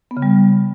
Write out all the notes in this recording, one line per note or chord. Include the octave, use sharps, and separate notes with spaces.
B3
C#3
G3